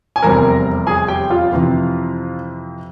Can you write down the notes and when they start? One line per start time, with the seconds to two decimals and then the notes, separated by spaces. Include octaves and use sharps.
0.16 G#5
0.22 F1 E2 C3 G3 C4 A#4 A#5
0.87 G#4 G#5
1.08 G4 G5
1.30 F4 F5
1.52 F2 C3 E3